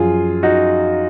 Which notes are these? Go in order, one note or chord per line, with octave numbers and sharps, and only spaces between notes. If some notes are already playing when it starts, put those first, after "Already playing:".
Already playing: F#2 F3 F4 G#4
D#4 F#4